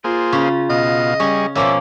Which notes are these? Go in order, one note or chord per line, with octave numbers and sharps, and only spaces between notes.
A#3 F4 G#4 C5
C#3 C#4
B2 D#5 F5
G3 C#4 G#4 C#6
B2 F3 A#3 C#4 D5 E5